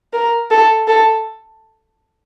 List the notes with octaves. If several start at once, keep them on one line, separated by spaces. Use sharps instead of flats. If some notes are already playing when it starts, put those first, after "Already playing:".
A#4
A4
A4